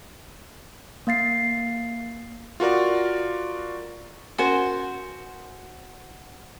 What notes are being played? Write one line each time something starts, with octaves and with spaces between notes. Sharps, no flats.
A#3 F5 A6 C7
F4 F#4 A#4 D5
C#4 F#4 A#4 C5 G#5